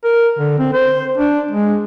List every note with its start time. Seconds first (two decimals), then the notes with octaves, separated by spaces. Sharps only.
0.04 A#4
0.39 D3
0.59 C4
0.73 C5
1.17 D4
1.51 G#3